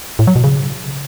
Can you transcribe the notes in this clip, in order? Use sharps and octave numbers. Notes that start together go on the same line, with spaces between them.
A2
F#3
B2
C#3